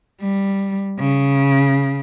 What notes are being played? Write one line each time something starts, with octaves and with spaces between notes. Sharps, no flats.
G3
C#3